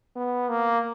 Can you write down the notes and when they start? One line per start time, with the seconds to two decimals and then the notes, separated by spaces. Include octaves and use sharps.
0.15 B3
0.49 A#3